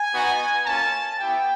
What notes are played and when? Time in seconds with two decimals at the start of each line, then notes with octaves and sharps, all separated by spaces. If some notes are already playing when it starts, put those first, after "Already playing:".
Already playing: G#5
0.13 B3 D#4 F#4
0.66 A#3 C#4 F4 A5
1.19 B3 E4 G4 G5